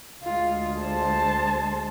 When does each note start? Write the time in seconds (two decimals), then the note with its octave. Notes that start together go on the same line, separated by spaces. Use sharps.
0.24 D2 G#3 F4
0.78 C5 A5